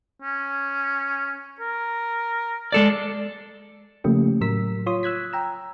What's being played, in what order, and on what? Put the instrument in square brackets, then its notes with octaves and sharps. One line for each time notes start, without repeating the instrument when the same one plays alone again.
[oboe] C#4
A#4
[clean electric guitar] G#3 A4 D5
[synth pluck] C#3 F3 A3 A#3 C#4 G4
A2 F#3 A#4 E6 B6
F4 C#5 C6 D#6
E6 F#6 G#6 B6
G5 A#5 E6